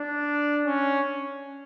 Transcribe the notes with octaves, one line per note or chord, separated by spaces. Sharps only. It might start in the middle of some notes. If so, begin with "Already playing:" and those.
Already playing: D4
C#4